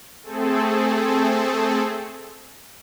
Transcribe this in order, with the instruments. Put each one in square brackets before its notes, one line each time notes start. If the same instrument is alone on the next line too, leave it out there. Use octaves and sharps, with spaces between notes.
[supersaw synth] A3 C4 G#4 A4